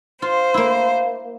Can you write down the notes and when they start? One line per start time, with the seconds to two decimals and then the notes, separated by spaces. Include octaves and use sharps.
0.22 F4 C5
0.54 A#3 E4